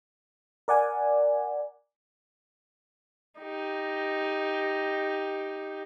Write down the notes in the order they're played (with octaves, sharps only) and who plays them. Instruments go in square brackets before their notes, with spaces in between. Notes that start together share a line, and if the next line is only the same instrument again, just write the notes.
[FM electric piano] A#4 D5 F#5 G#5
[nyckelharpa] D#4 G4